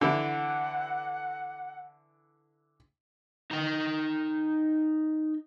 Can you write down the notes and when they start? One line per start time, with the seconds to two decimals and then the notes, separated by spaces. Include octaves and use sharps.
0.01 D3 E3 E4 F#5
3.51 D#4 G5